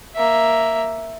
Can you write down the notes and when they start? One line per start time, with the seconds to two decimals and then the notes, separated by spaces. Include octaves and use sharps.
0.16 A#3 E5